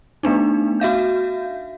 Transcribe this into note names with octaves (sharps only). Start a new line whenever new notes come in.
A3 B3 D4 D#4
F#4 E5 F5 G6